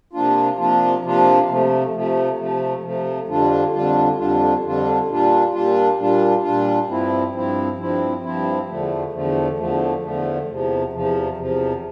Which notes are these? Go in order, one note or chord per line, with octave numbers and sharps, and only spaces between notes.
C3 F3 A#3 D4 F4
C3 F3 A#3 D4 F4
C3 F3 A#3 D4 F4
C3 F3 A3
C3 F3 A3
C3 F3 A3
C3 F3 A3
F2 D3 G3 D4 F4
F2 D3 G3 D4 F4
F2 D3 G3 D4 F4
F2 D3 G3 D4 F4
A#2 G3 D4 F4
A#2 G3 D4 F4
A#2 G3 D4 F4
A#2 G3 D4 F4
G2 F3 C4 E4
G2 F3 C4 E4
G2 F3 C4 E4
G2 F3 C4 E4
E2 D3 F3 A3
E2 D3 F3 A3
E2 D3 F3 A3
E2 D3 F3 A3
E2 C3 F3
E2 C3 F3
E2 C3 F3